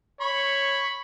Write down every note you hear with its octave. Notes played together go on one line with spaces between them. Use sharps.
C#5 B5 C#6